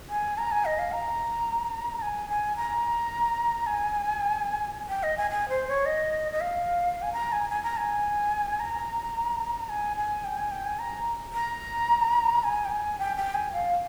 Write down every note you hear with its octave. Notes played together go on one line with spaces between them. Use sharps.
G#5
A#5
G#5
D#5
F5
A#5
A#5
G#5
G#5
A#5
G#5
G5
D#5
G#5
G#5
C5
C#5
D#5
D#5
F5
G#5
A#5
G#5
G#5
A#5
G#5
A#5
G#5
G#5
G5
G#5
G5
G#5
A#5
A#5
G#5
G5
G#5
G5
G5
G#5
F5